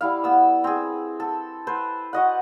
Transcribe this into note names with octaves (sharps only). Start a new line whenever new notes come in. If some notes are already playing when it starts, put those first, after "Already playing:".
G3 E4 F5
B3 E6
C4 G#4
A4
B4 C5
F#4 D#5 F#5